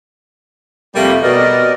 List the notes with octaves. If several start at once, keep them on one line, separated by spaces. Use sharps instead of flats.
F2 C3 G3 A3 A#3
B2 A#4 D5 D#5